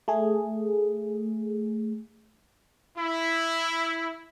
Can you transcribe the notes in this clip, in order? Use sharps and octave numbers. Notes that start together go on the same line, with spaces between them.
A3 G#4
E4